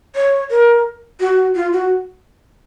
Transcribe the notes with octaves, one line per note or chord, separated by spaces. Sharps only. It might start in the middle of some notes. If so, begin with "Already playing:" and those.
C#5
A#4
F#4
F4
F#4